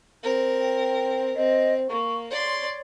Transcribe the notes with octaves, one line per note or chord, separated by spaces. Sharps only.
C4 A#4
G5
C4 D#5
A#3 C#6
C#5 D5 C6